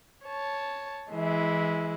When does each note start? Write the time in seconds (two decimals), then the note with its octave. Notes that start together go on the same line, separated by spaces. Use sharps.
0.25 C#5 A5
1.11 E3 G#3 E4